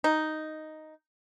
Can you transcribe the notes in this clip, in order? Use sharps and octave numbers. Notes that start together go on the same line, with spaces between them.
D#4